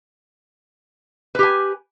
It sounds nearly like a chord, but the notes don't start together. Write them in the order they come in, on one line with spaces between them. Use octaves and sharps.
B4 G4 G#5